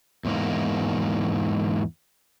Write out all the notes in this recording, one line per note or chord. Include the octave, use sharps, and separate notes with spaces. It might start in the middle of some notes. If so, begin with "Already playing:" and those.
E2 G#2 A#3